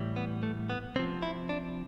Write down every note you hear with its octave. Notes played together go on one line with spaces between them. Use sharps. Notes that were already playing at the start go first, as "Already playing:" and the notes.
Already playing: A2 E3 G3
B3
A3
B3
C3 F3 C4
E4
D4